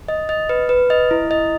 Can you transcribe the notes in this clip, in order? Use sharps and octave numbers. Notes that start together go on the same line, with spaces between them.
D#5
D#5
B4
B4
D#5
E4
D#5